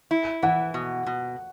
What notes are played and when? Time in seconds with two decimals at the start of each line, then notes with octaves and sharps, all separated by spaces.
0.11 E4
0.42 E3 F#5
0.74 B2
1.06 B2